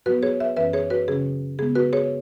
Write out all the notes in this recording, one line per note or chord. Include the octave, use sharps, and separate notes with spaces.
G#2 F#3 B3 F#4 B4
G#4 C#5
B4 E5
F#2 E3 C#4 B4 E5
G#4 C#5
F#4 B4
C#3 F#3 C#4 G#4
C#3 G#3 B3 G#4
F#4 B4
G#4 C#5